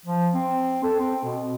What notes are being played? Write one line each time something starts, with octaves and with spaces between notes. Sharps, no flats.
F3
C4
A4
C4
B2